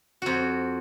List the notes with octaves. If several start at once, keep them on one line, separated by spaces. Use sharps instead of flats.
F2 F#4